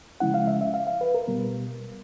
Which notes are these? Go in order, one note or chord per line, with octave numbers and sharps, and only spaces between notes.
C#3 F3 G#3 C#4 E4 F#5
F5
E5
E5
F5
F5
B4
A#4
B2 G3 B3